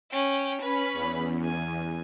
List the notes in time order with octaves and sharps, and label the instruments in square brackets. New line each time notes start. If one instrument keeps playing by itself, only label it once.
[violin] C#4 G5
[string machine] C#4 [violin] B4 B5
[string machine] E2
[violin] G#5